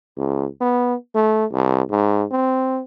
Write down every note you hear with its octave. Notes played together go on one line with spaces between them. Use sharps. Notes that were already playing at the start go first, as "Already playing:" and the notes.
C#2
B3
A3
C2
G#2
C4